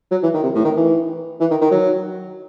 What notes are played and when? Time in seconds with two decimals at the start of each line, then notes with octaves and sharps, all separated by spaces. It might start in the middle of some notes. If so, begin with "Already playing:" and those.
0.11 F#3
0.23 E3
0.34 D#3
0.43 C3
0.55 A2
0.65 D#3
0.76 E3
1.40 E3
1.51 D#3
1.61 D#3
1.71 F#3